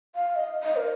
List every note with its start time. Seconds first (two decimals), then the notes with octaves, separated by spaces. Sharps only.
0.15 F5
0.36 D#5
0.62 D#5
0.76 A#4